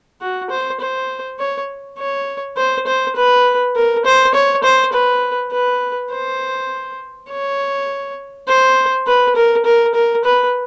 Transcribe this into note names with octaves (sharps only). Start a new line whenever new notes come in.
F#4
C5
C5
C#5
C#5
C5
C5
B4
A#4
C5
C#5
C5
B4
B4
C5
C#5
C5
B4
A#4
A#4
A#4
B4